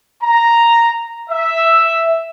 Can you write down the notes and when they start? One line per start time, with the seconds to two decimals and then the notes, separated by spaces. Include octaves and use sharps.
0.23 A#5
1.30 E5